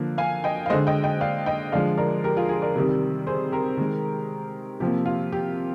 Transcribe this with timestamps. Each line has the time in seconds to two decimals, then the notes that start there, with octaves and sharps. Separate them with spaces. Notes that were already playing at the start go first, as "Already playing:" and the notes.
Already playing: D3 F3 A#3
0.18 F5 G#5
0.44 D#5 G5
0.66 F5
0.70 D3 G#3 C5 D#5
0.87 D#5 G5
1.03 D#5 G5
1.21 D5 F5
1.46 D#5 G5
1.72 D3 F3 G#3 D5 F5
1.98 A#4 D5
2.24 G4 A#4
2.37 F4 G#4
2.49 F4 G#4
2.62 A#4 D5
2.76 C3 D#3 G3
3.27 G#4 C5
3.52 G4 A#4
3.77 D#3 G#3
4.80 C3 F3 A#3 G4
5.06 F4
5.32 G4